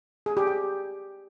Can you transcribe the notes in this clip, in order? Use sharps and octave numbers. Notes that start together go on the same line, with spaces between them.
G#4
G4
G5